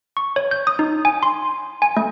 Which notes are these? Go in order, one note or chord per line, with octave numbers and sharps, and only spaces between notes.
C#6
C#5
G6
D#6
D#4
G#5
C6
G#5
A3